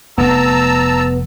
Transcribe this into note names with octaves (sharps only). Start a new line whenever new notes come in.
F1 B3 A5 A#5 E6